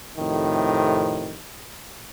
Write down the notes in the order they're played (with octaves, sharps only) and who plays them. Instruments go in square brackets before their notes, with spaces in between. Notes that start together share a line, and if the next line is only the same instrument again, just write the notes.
[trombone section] F2 A2 C3 D#3